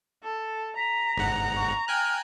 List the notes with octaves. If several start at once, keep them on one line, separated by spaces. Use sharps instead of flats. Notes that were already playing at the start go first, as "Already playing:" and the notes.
A4
A#5 B6
G1 G#2 F#5
C#6
G5 G#5 F6 F#6